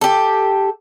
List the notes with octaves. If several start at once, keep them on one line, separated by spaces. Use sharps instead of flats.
G4 A4